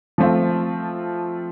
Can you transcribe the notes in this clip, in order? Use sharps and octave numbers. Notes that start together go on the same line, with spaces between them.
F3 A3 C4 F4